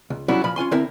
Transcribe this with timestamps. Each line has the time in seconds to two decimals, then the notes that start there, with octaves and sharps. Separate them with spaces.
0.10 C#2
0.28 F#3 G3 C#4 E4 F#4
0.44 A#2 F3 B5
0.56 C#4 F4 G#5 C6
0.71 D3 C4 E4 A#4